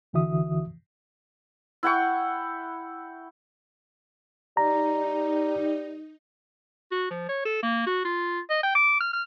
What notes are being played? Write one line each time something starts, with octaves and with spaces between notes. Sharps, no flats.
C2 D3 E3 F#4 E5 D#6
E4 F#5 G5 C#6
G3 D#4 A#5
F#4
F3
C#5
A4
A#3
F#4
F4
D#5
G5
D6
F6
F6